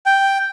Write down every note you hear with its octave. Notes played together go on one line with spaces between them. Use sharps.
G5